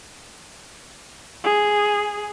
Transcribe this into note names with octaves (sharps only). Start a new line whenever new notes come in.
G#4